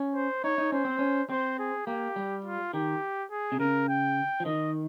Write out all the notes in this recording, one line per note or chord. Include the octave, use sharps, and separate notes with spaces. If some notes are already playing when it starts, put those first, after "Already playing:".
Already playing: C#4
C5
D#4 C#5
D#4
C#4 C5
C4
C#4
C4 C5
G#4
A#3 G4
G3
F4
D#3 G4
G#4
C3
C#3 A#4
G5
F3
D#3 D#5